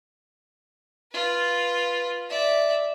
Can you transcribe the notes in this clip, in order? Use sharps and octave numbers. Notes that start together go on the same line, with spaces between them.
F4 B4
D5 E5